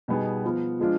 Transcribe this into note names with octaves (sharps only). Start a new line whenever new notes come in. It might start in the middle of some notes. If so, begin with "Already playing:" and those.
B2 G3 B3 D#4 G#4
F3 B3 F4
F3 G#3 D4 F4